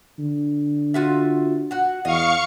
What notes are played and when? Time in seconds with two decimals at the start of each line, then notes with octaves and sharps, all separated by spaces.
0.19 D3
0.94 F4 F#4 E5
1.71 F#4 F#5
2.05 E2 D#5 F5 C#6 C#7